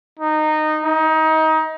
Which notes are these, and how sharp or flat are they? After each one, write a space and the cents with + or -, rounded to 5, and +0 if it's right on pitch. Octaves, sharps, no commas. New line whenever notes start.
D#4 -15
D#4 +25